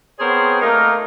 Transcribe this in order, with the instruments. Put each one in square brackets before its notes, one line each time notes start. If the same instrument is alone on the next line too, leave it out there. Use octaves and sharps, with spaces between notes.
[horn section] B3 C4 G#4 A#4 C5 C#5
A3 A#3 D#4 F4 A#4